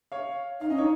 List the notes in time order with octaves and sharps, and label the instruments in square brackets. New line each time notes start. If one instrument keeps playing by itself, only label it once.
[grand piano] C#5 F5
[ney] D#4 [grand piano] F5
[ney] C#4 [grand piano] D#5
[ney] D#4 [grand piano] C#5